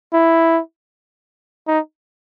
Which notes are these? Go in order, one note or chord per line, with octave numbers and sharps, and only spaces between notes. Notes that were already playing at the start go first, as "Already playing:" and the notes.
E4
D#4